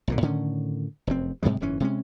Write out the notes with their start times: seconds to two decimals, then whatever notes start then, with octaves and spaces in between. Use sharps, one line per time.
0.08 B1 A#2 D3
0.21 A2 D3 D#3 C#4
1.07 F1 F#2 C4
1.43 G#2 C3 G3 G#3
1.60 F#1 G#2 E3 C#4
1.80 C3 G#3 C#4